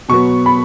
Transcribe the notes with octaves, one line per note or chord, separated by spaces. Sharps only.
B2 F#3 B3 C#6
B5